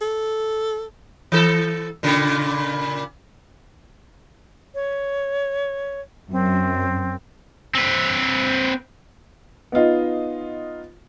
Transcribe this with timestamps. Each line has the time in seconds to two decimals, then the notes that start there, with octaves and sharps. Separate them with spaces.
0.01 A4
1.32 E3 A4
2.03 A#2 C#3
4.75 C#5
6.31 F#2 C4
7.75 C4 B4
9.72 B3 D#4 F4 D#5